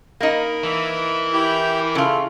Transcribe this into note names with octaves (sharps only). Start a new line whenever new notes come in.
A#3 D#4 A#4 B5
E3 E5
E4 G4 G6
C#3 E4 F4 A4